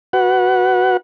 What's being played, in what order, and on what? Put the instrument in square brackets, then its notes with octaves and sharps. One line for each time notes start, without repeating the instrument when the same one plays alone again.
[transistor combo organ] F#4 B4 F#5